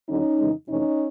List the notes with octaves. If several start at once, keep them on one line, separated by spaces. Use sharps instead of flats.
D#2 D3 F#3 C#4 D#4
F2 C#3 E3 G#3
F2 C3 E3 A3 C#4 D#4